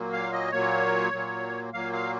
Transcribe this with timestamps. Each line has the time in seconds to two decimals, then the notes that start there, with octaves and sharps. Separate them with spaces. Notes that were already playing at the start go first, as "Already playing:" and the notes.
Already playing: A#2 F#3 A#3
0.13 F5
0.33 D#5
0.52 A#2 F#3 A#3 C#5
1.12 A#2 F#3 A#3
1.73 A#2 F#3 A#3 F5
1.93 F5